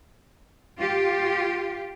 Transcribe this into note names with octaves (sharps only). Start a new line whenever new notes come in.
F4 G4